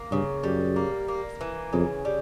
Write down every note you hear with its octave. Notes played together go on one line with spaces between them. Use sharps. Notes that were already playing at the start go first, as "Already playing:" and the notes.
Already playing: A#3
G2 C#3
F#2 G3
A#3
A#3
E3
F2 C#3
G3